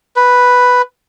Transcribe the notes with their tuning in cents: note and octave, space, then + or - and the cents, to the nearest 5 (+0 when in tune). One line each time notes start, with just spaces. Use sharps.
B4 +0